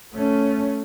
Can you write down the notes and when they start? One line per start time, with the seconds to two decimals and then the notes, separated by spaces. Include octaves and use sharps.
0.14 A3 C#4